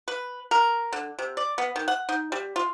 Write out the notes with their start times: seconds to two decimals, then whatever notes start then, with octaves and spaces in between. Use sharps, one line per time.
0.08 B4
0.51 A#4
0.93 D3
1.19 C3
1.37 D5
1.58 B3
1.76 D#3
1.88 F#5
2.09 D#4
2.32 G3
2.56 F4